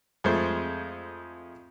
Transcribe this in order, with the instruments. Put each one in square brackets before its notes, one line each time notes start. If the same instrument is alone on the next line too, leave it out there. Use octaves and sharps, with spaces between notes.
[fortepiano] F2 G#3 A3 C5